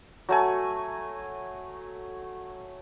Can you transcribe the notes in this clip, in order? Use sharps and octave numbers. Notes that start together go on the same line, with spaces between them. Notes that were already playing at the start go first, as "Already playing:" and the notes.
F#3 A3 G#5